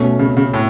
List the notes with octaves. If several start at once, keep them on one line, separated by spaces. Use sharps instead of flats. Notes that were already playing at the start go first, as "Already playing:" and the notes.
Already playing: B2 A3 C#4
C#3
C#3
A2